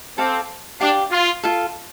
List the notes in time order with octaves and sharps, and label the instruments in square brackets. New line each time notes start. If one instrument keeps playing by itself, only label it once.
[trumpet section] C4 [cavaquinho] A4 F5 D6
[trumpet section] D4 [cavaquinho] G4 F5 D6
[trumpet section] F4
[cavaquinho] F4 A4 F5